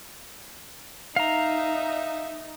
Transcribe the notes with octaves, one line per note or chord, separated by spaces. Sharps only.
D#4 E5 F5 A#5